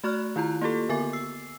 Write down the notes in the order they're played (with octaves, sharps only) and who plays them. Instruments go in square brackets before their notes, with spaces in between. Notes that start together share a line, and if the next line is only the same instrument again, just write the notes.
[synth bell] A3 F#4 D5 C#6 F6 F#6
D#3 E4 F4 A#5
A#3 F4 G4 A4
D3 B3 A#4 G#5 D6 A6
E6 C7